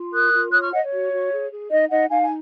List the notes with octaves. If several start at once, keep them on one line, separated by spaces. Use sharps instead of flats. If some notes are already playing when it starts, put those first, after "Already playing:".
Already playing: F4
A#4 D#6 F#6
F4
C#5 D#6 F#6
C#6 F6
C#5 D#5 F#5
C#5
F#4
F#4
G#4
G#4
D#4 D#5
D#4 D#5 F#5
D#4 F5 G#5
G#5